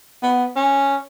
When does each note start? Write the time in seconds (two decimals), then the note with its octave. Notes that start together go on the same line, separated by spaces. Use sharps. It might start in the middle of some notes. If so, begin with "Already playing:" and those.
0.23 B3
0.56 C#4